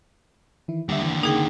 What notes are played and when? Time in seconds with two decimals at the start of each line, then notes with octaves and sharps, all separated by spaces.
0.68 D#3 E3 E4
0.89 D#2 D3 G3 E5
1.02 E3
1.23 C#3 A#3 D#4 G#4 G5